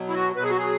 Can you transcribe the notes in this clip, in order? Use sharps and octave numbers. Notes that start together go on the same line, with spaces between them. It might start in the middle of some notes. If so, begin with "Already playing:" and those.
Already playing: B2 F#3
E4
F#4
B2 F#3 B4
G#4
F#4
G#4